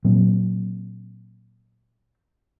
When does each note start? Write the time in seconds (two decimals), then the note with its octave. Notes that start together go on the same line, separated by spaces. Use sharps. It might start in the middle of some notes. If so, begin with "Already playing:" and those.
0.05 A#2 F#3 C4